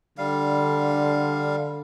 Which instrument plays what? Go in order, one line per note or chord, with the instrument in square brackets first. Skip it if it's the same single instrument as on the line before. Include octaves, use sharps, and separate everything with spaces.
[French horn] D3 [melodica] G3 F5